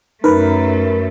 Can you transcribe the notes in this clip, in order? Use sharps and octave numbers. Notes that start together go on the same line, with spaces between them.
F#2 A3 D#4 A#4 B4